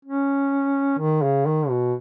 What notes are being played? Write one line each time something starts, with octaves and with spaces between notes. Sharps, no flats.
C#4
D#3
C#3
D#3
B2